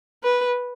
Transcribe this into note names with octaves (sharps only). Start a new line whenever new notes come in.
B4